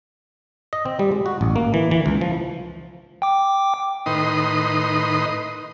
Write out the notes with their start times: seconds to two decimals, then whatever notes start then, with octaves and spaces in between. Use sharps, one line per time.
0.73 D#5
0.86 C4
0.99 G3
1.12 G#3
1.26 F#4
1.41 A1
1.56 A#3
1.74 E3
1.91 E3
2.06 C#2
2.21 F3
3.22 G5 D6
4.06 A2 D#3 D#4 B4 C6 D#6